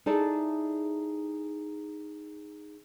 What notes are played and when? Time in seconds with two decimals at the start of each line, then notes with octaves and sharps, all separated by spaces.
0.06 D#4 E4 G#4 A4 D5 E5